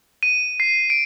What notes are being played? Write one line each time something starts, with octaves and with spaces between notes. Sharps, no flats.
D#7
C7
D7